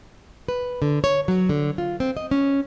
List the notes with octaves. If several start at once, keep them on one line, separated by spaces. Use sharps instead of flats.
B4
D3
C#5
F#3
D3
F4
C4
D#5
C#4